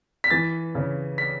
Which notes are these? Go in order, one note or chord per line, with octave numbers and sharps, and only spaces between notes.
B6
E3 A6
C#3
B6